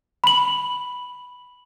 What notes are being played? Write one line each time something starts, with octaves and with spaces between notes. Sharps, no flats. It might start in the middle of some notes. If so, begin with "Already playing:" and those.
B5 F#7